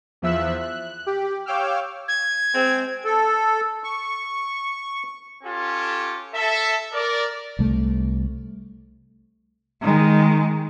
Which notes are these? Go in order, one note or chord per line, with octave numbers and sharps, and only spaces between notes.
E2 F3 E5 E6 F#6
F#6
G4
C#5 F5 G5 D6 E6 F6
G#6
G#3 C4
A4
C#6
C#4 F4 G4 A4
A4 E5
A#4 D5
C2 A3
D#3 G#3